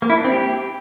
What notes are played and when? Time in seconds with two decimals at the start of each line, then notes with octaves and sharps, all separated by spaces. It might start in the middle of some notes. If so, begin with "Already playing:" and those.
0.02 A#3
0.10 E4
0.17 D4
0.24 C4
0.32 G4